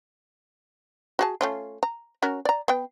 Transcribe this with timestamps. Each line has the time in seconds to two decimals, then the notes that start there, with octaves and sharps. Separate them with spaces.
1.19 F#4 G#4 A5
1.41 A3 C#4 F4
1.83 A#5
2.22 C#4 F#4 A#4
2.45 D5 A#5
2.68 B3 G5